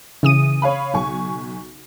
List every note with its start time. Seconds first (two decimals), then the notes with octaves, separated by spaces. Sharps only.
0.23 C#3 E3 D#6 D#7
0.62 C#5 F5 B5
0.94 B1 G#5 C#6